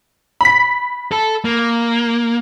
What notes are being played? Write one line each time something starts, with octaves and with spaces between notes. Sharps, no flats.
B5 B6
A4
A#3